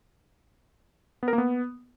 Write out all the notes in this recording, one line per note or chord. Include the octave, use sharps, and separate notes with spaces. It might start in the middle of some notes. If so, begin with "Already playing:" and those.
B3
A#4
A#3
B3